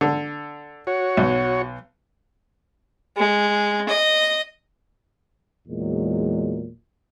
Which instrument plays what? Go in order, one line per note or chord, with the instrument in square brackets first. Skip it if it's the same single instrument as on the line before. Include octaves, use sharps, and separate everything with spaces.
[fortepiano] D3
[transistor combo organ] F#4 C#5
[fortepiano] B1
[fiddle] G#3
D#5
[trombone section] E2 A#2 F#3 G#3